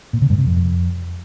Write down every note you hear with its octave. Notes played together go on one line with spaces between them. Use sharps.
A#2
C#3
G2
C3
F2